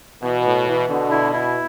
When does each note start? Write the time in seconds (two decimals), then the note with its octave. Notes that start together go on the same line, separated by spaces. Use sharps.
0.22 B2 E3
0.44 A2
0.67 E3
0.88 B2 D3
1.11 E4
1.33 E4